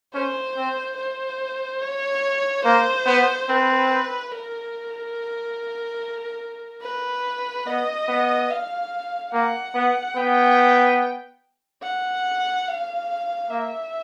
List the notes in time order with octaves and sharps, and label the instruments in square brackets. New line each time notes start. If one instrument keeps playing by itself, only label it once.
[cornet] C#4 [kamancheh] C5
[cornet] C4
[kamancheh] C5
C#5
[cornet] A#3 [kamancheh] C5
[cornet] B3
[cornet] C4 [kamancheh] B4
[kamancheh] A#4
B4
[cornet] B3 [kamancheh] D#5
[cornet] B3
[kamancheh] F5
[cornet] A#3 [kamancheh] F#5
[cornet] B3
[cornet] B3 [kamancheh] G5
[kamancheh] F#5
F5
[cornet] A#3 [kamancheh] E5